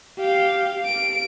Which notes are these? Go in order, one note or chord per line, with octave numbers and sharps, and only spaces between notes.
G4 F5
D7